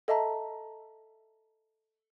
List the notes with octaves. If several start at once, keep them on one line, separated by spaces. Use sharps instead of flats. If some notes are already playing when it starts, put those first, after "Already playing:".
A4 D#5 E5 A5 A#5